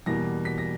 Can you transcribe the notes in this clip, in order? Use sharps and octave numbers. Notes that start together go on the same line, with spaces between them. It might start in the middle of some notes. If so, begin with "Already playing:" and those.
E2 B2 G3 A#3 A#6
B6
A#6